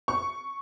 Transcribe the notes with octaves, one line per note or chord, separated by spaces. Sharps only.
C#6